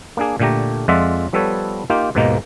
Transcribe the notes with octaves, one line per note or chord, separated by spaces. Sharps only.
A#3 D4 G#4
A#2 D3 A3 G4 A#5
F2 G#3 F4 D5 E5 F#5
F3 G3 B3 A4 B4 C#5
A#3 D#4 F4 G4
D#2 G#2 B2 D#3 A#3 D#4